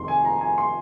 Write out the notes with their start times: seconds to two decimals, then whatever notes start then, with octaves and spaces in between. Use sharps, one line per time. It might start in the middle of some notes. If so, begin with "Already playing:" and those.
Already playing: F1 F2 D#3 C6
0.08 G#5
0.25 A#5
0.41 G#5
0.58 C6